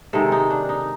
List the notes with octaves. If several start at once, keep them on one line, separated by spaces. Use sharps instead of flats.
C3 D#3 G#3 A4
D#4
D4
D#4